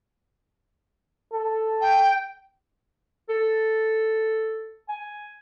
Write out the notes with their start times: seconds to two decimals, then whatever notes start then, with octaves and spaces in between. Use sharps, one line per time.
1.33 A4
1.81 G5
3.29 A4
4.89 G#5